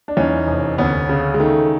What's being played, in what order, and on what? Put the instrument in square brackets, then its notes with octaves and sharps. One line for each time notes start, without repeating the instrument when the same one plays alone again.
[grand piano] D4
E2 C#4 D#4
F1
D2 B3 C#4
C#3
G#3
D#3 A3